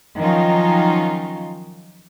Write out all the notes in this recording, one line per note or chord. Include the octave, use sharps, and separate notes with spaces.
D#3 F3 F#3 C#4 D#4 F4